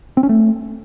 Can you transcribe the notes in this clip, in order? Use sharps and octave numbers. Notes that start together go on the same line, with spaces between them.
C4
C#4
A3